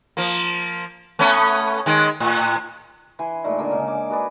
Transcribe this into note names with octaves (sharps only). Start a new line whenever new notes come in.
F3 A#3
A3 B3 C#4
D#3 G#3
A2
E3 G#5 C6
A#2 G#3 A3 D#4
D3 A#3 G#4 G#5
C#3 G#3
D6
F#4 G#4 B4 D5